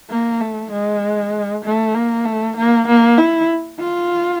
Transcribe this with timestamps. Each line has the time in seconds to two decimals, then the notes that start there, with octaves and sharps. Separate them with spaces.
0.10 A#3
0.40 A3
0.72 G#3
1.65 A3
1.95 A#3
2.25 A3
2.57 A#3
2.88 A#3
3.17 E4
3.80 F4